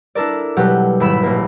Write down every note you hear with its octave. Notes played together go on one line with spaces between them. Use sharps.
D4 E4 A4 A#4 D5
B2 F#3 G3 G4 F#5 G5
D#1 G#2 E4 B5 B6 E7
A#1 A#3 A#4